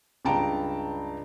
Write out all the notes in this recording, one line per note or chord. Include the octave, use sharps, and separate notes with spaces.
C#2 G2 G5 A5 A#5 D7